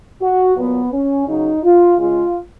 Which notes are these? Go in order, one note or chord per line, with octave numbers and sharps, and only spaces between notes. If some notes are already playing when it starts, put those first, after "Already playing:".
F#4
A#2 F#3 B3
C#4
C#3 F#3 D#4
F4
C#3 G#3 F4